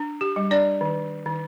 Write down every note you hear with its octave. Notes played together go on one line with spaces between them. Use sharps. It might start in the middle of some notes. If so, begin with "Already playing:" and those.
Already playing: D4
G4
G3
D4 D5
D#3
D#3